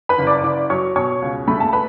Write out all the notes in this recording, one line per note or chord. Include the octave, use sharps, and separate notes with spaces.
B4 B5
F#1
D5 D6
F#1 D5 D6
F#3 C#5 C#6
B2 C#5 C#6
C#2
A3 B5
A5
B4 B5